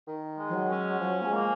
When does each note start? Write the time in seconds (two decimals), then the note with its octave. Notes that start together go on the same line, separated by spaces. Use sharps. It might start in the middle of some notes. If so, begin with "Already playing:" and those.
0.07 D#3
0.38 G#3
0.48 F3
0.53 F#3
0.69 C#4
1.00 F3 F#3
1.21 A#3
1.24 G#3
1.32 A#3